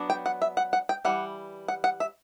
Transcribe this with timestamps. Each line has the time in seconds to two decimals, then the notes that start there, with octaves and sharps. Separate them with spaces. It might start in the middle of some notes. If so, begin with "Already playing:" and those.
Already playing: F#3 B3 D4
0.10 G5
0.26 F#5
0.42 E5
0.57 F#5
0.73 F#5
0.89 G5
1.05 E3 G3 F#5
1.68 F#5
1.84 F#5
2.00 E5